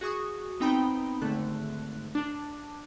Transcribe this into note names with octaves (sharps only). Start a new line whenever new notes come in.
F#4 G#4 C#6 D#6
B3 C4 D#4 G5 A#5 B5
G#1 D3 A3 A4 F#6
D4